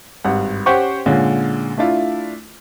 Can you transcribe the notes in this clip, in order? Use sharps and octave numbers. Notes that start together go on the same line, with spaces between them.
G#1 G2 F#5
C#4 G4 C5 F#5 G5 C#6
A#2 D3 G#3 C#4 F4
A3 D4 E4 F4